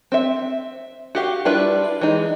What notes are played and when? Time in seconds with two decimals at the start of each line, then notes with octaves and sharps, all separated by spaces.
0.12 C4 E5
1.15 F#4 G4 F5
1.45 G3 D4 E4 F4 B4
2.01 E3 G#3 D#4